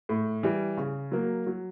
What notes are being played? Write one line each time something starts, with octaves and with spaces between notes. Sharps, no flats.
A2
E3 G3
C#3
F#3 A#3
F#3